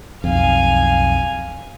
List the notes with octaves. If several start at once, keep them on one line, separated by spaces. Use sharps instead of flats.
B1 F2 F5 G#5